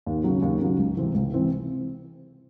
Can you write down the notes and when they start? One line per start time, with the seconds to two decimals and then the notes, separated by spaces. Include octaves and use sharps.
0.06 D#2
0.24 C#3 F#3
0.42 D#2
0.61 C#3 F#3
0.78 C#2
0.97 C3 E3 C4
1.14 C#2
1.33 C3 E3 C4